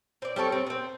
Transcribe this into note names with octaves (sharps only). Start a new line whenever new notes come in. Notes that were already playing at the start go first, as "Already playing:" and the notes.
C4 D5
G3 C4 A4 C#5
C4
B3 C4